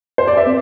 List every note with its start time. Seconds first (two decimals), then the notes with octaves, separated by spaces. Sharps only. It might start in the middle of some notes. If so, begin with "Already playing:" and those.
0.18 C5
0.27 D5
0.37 E5
0.46 C4